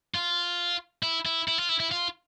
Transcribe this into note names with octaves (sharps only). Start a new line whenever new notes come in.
F4
E4
E4
E4
F4
E4
E4
F4